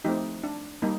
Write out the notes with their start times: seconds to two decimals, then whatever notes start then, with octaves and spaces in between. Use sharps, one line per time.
0.05 F3 A3 C4 D#4 G4
0.43 D4
0.82 G3 A#3 D#4